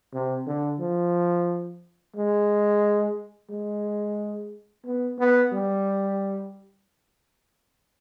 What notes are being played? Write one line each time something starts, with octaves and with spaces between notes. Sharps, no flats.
C3
D3
F3
G#3
G#3
B3
B3
G3